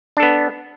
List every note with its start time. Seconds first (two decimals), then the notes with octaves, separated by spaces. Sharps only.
0.17 D4
0.20 A4
0.23 B3